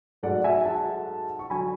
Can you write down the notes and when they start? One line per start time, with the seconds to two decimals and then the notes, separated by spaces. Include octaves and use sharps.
0.23 G#2 F#3 A3 D5 F#5
0.44 E5 G#5
0.65 F#5 A5
1.39 C#6
1.50 D3 F#3 G#5 B5